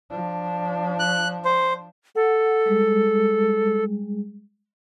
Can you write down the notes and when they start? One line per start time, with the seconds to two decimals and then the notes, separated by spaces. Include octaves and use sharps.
0.10 F3 D4
1.00 F#6
1.45 C5
2.16 A4 F#5
2.66 G3 G#3 G#4